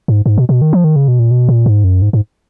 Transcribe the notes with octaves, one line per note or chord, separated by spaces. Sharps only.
G#2
G#2
B2
B2
D#3
F3
D#3
C#3
B2
A#2
B2
A#2
G#2
F#2
G#2
G#2